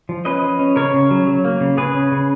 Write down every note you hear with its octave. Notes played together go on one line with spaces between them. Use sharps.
F3
C#4 B4 D#5
F3
C#4
C#3 A#4 C#5
C#3
F#3
F#3
A#3
C#3
C#3 G#4 B4
C#3
C#3